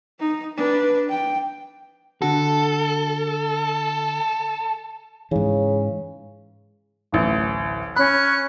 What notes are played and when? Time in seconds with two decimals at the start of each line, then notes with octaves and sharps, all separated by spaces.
0.19 D#4
0.57 D4 B4
1.09 G5
2.22 D3 F#4 A4
5.31 G#2 C#3 E3
7.12 D1 A1
7.96 C#4 B5 F#6